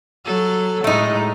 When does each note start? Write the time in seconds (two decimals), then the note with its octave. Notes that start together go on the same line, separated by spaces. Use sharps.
0.25 F#3 A4
0.84 A2 G#3 A3 D#4